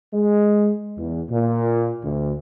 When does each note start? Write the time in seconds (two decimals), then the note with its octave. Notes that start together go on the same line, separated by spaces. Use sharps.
0.13 G#3
0.96 E2
1.30 A#2
2.03 D2